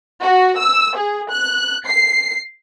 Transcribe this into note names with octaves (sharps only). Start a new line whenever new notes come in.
F#4
E6
G#4
F#6
C7